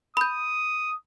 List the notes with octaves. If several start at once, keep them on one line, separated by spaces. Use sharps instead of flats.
B5 D#6 G6